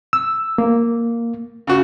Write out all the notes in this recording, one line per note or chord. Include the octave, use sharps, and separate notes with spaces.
E6
A#3
C#3 F#4